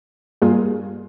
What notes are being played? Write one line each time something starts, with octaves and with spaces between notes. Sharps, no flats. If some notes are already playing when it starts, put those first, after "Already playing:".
G2 G3 A#3 F4 G#4